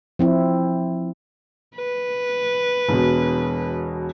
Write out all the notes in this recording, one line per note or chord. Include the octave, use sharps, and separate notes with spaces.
F3 C4 E4
B4
E1 B2